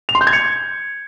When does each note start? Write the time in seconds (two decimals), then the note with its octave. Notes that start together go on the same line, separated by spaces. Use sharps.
0.09 F7
0.15 C6
0.21 G6
0.27 G#6
0.33 C#7